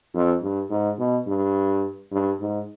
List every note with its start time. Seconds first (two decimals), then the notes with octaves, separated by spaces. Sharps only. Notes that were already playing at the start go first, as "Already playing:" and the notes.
0.14 F2
0.43 G2
0.70 G#2
0.99 B2
1.27 G2
2.12 G2
2.40 G#2